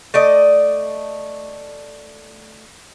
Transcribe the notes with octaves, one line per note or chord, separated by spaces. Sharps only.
A3 D5 D#5